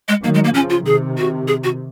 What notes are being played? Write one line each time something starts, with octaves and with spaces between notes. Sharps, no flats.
G#3
D#3 F#3 A#3
G#3
A#3
C#3 F3 C#4
F4
C3 D#3 G#4
F#4
G#4
F#4